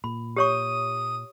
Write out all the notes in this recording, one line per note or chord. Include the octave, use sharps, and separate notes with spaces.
A#2 B5
G4 C#5 C#6 D#6